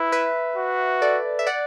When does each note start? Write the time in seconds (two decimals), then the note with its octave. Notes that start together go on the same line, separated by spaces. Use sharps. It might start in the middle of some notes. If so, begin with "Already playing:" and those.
Already playing: E4 B4
0.12 B4 E5
0.56 F#4
1.02 A4 D5
1.39 E5
1.47 D5 F#5